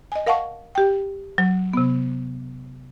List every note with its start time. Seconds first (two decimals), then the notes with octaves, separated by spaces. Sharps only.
0.12 D#5 G#5
0.26 A#4 F5 F#5 A5 C#6
0.75 G4 G5
1.38 F#3
1.73 C3 B3